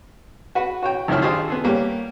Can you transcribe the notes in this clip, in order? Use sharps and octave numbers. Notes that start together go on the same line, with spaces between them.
F#4 B4 F#5
F#4 C#5 G5
G#1 C#2 D#3 F#3 E4 F6
D4 F4 G4 G#4 C5 D#5
B3 G#4 A4
G3 A#3 B3 C#4 G4